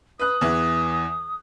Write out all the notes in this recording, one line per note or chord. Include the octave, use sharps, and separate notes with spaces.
B4 D#6 F#6
E2 E3